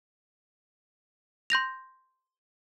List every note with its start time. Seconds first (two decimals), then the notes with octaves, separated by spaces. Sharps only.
1.50 C6 G6 A#6 F7